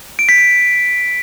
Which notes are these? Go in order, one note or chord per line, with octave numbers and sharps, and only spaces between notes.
D7
B6
D7